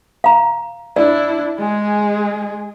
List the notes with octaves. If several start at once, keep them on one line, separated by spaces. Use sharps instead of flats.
F5 A#5
D4 E4 D5
G#3 G#4